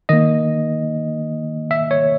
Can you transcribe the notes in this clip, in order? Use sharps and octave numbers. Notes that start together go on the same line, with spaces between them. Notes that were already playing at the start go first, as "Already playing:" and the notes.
D#3 A#3 D#5
E5
C#5